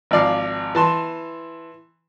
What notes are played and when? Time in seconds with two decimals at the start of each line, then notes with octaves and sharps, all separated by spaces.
0.11 G#1 F3 D5 F5
0.75 E3 A5 C6